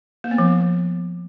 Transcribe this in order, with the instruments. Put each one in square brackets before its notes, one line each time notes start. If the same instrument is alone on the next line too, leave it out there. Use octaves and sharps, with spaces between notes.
[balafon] A#3
B3
F3